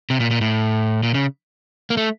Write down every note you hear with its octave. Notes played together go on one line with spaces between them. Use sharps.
C3
A#2
A#2
A2
A#2
C#3
A#3
A3